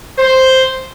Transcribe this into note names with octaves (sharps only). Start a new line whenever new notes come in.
C5